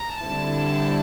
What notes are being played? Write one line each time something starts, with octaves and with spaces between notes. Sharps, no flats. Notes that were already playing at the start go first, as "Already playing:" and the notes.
Already playing: A#5
D3 G3 C4 E4 A5